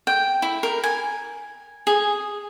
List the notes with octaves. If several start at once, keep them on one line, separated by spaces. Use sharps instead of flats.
G5
E4
A#4
G#5
G#4